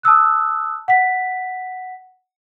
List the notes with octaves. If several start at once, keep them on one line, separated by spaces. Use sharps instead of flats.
A5 D#6 E6 F#6
F#5 B6